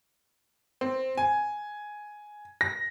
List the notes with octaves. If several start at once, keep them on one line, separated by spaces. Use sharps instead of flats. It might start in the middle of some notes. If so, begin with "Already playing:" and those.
C4
G#5
A#6